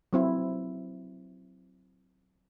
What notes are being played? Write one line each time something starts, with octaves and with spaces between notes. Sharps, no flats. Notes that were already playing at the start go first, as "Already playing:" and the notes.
F#3 C4 E4